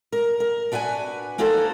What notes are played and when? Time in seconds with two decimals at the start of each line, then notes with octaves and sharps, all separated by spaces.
0.12 A#4
0.40 A#4
0.72 D4 F#4 B4 F#5 G#5
1.38 A#3 D#4 F#4 A4 C5